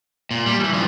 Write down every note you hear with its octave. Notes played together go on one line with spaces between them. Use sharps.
A#2
G3
E3 F#3
G2 F3